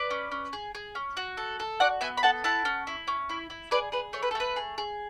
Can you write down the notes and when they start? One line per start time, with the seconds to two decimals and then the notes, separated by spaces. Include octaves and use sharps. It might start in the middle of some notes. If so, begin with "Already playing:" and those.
Already playing: B4 D5
0.11 C#4
0.32 C#4
0.53 G#4
0.75 G#4
0.95 C#4
1.17 F#4
1.37 A4
1.60 A4
1.80 F#4 D5 F#5
2.01 B3 E5 G#5
2.17 B5
2.23 A4 F#5 A5
2.44 E4 F#5 A5
2.65 C#4
2.87 E4
3.07 C#4
3.29 E4
3.50 E4
3.71 G#4 B4 D5
3.92 G#4 B4
4.13 A3 C#5
4.23 B4
4.31 A4
4.35 A3 B4
4.56 G#4
4.78 G#4